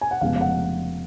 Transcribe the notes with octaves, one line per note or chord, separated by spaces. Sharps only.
G#5
F#5
F1 F2 C#3 G#3 B3 F5
F5
F#5